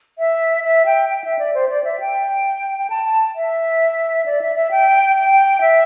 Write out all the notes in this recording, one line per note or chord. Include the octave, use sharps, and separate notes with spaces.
E5
E5
G5
G5
E5
D5
C5
D5
E5
G5
G5
A5
A5
E5
D5
E5
E5
G5
G5
E5